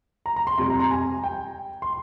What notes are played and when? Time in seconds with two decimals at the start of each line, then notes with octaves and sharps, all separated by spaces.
0.26 A#5
0.36 A#5
0.47 C6
0.58 F2 C3 G3 C6
0.70 A#5
0.80 A#5
0.91 G#5
1.24 G5
1.82 C6